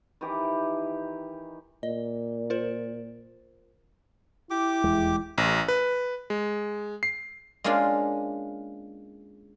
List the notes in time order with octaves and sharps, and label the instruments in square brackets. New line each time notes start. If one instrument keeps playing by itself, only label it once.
[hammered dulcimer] D#3 E3 G4
[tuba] A#2 [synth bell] D#5
[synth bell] F4 A#4 C5
[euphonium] E4 [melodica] G4 D6
[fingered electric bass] D#1 E2 G#3
[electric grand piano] A1
B4
G#3
C7
[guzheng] G#3 A#3 C#4 D4 F4